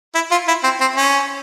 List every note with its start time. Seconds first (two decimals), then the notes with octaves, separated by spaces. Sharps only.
0.15 E4
0.31 F4
0.48 E4
0.64 C4
0.81 C4
0.96 C#4